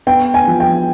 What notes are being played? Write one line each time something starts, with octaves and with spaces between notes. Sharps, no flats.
B3 G5
G#5
F3
G5